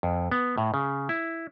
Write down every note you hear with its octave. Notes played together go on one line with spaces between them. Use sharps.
F2
B3
A2
C#3
E4